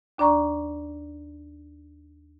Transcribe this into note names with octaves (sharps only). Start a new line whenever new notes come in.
D#2 D4 D5 A#5 C#6